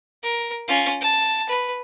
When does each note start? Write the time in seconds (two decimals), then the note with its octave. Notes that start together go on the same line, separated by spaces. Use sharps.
0.23 A#4
0.68 C#4 F4
1.01 A5
1.49 B4